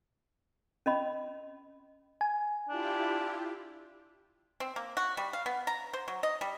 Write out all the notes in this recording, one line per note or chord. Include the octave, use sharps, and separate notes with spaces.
C#4 D#5 B5
G#5
D4 E4 F4 G4
C4
A#3
F#4
G3
F5
B3
A#5
C5
F#3
D#5
G3